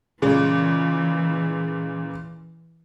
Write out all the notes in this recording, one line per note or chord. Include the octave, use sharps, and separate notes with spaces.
A#2 C#3 E3 G#3